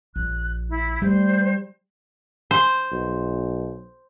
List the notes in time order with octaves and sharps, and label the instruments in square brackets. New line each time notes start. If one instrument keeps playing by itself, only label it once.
[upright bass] A#1 [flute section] F#6
[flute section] E4
[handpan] G3 [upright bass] A3 [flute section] C5 G6
[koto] C5
[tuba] B1